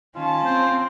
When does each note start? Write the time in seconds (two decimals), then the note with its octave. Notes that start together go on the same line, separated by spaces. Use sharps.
0.16 D#3 C#4 F4 A5
0.46 C4 C5